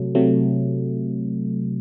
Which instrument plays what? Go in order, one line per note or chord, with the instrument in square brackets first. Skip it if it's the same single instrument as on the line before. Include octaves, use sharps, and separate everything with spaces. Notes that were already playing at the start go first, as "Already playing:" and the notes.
Already playing: [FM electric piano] C3 F#3 A3
C3 F#3 A3